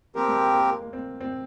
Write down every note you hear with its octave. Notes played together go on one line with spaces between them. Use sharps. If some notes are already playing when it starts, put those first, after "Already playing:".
F3 A#3 C4 G4 A#4
G#3
A#3
A#3
A#3
C4
C4